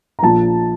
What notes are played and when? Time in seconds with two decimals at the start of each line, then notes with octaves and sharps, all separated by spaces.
0.19 A#5
0.22 A#1 A#2 F3 A5